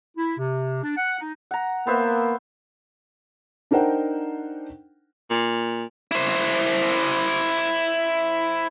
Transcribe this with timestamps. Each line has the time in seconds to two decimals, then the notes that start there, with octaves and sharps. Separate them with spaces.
0.16 E4
0.36 C3
0.82 D4
0.96 F#5
1.18 D#4
1.51 F#5 A#5
1.87 A#3 B3 C5 E5
3.71 D4 D#4 A#4 C5 F#5 G5
5.30 A#2
6.11 E4 C5